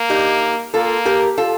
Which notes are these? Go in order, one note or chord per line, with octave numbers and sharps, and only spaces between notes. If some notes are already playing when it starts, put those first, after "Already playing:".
Already playing: A#3
D#4 G4
A#3 F4 A4
G4 A#4
F4 A4